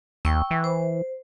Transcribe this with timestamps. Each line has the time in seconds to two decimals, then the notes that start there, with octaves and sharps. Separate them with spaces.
0.25 D#2 G5 C#6 E6
0.51 E3
0.64 C5